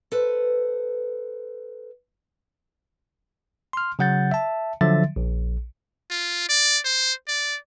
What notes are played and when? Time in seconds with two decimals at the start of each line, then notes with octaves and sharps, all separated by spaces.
0.12 A4 B4 C5
3.73 C6 F6
3.99 C#3 F#3 F#5 G6 A6
4.31 E5 A5
4.81 D3 F3 F#3 E5 A6
5.16 A#1
6.10 F4
6.49 D5
6.84 C5
7.28 D5